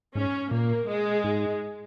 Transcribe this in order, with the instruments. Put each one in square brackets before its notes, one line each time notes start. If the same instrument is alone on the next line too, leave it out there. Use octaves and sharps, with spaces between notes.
[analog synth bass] G#2 [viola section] C#4
[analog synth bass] A#2 [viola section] A#3
[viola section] G#3
[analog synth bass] G#2